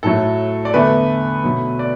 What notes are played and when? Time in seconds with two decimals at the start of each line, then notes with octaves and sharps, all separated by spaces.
0.03 A2 F#3 A3 A4
0.65 D5
0.74 E2 D3 A3 B4
1.44 B2 F#3 A3
1.79 D5